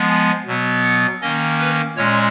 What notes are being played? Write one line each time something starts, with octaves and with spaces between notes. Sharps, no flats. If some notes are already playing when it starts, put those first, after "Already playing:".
Already playing: F3 G#3 B3
G#5
B2 F#3 B3
F#5
D#3 A#3 C#4 D#5
B4
A#2 G#3 C#4 C#5